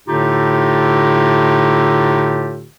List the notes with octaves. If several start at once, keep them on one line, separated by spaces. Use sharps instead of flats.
A2 D3 A3 D#4 F4 G4